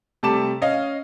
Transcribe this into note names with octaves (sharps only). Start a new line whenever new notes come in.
C3 G3 A3 A5 D6 E7
C#4 D#5 F5